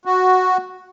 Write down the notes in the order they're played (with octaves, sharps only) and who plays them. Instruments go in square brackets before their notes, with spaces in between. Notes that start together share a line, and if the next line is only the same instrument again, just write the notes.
[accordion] F#4